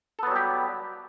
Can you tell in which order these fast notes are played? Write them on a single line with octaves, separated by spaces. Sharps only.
A4 B3 F#3 G3 G4